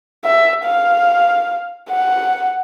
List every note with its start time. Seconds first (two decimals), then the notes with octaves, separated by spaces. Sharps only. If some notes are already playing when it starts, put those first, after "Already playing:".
0.24 E5
0.65 F5
1.90 F#5